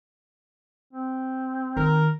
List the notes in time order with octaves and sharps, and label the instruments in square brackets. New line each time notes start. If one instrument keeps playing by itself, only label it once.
[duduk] C4
[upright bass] D#3 [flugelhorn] A#4